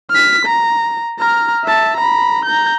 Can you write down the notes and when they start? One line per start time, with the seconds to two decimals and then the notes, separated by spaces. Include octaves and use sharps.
0.10 F6 B6
0.45 A#5
1.19 A#5 F6
1.65 E5 A5
1.97 A#5 B5
2.45 A#5 G6